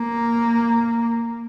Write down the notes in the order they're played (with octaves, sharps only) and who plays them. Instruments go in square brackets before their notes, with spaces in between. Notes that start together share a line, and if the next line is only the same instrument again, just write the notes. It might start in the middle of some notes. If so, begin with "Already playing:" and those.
Already playing: [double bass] A#3